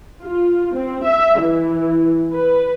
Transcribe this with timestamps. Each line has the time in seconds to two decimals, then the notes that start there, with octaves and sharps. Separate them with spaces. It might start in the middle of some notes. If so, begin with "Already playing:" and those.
0.22 F4
0.74 C4
1.04 E5
1.40 E3
2.33 B4